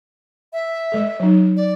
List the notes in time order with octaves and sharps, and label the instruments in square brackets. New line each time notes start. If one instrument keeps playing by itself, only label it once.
[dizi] E5
[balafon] G#3 A4
F#3 D#4
[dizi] D5